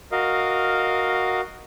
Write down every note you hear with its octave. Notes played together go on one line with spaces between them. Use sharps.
F#4 A#4 D#5 F5